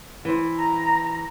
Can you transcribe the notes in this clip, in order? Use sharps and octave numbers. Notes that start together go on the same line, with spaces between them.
E3 C5
A#5